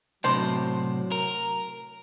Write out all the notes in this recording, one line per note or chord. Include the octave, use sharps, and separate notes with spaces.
A2 C3 F#3 D4 C5
A#4